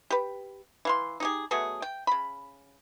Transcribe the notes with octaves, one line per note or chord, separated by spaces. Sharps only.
G4 B4
E3 F5 C6
D#4 G4 G#4
B2 F#3 A3 G#4
G5
C#3 B5